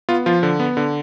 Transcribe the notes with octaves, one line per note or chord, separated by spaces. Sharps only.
B3 F4
F3 F4
D3
B3
D3